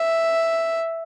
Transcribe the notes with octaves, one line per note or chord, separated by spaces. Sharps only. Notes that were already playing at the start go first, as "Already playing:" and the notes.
Already playing: E5